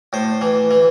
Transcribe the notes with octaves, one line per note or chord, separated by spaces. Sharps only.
A2 C5
E3
E3